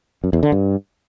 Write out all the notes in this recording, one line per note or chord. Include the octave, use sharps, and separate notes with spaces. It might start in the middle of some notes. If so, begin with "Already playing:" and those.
F#2
E2
D3
G2